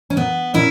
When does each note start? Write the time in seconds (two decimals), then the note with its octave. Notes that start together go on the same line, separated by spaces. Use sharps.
0.10 C#4
0.16 A#2 B3
0.54 A#2 C#4 E4